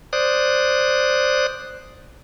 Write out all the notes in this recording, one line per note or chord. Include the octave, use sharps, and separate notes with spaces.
C5 D5 D#6 F#6